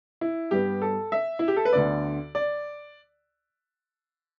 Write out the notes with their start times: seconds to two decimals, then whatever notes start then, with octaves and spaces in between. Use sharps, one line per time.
0.21 E4
0.51 G2 G3 B3 G4
0.82 A4
1.12 E5
1.39 E4
1.48 G4
1.56 A4
1.65 B4
1.73 D2 D3 B3 D5
2.35 D5